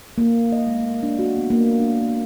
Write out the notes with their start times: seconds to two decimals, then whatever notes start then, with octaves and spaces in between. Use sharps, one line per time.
0.18 A#3
0.52 D#5
0.67 G#3
0.81 A3
1.03 D4
1.19 F#4
1.37 B3
1.50 A#3
1.80 D4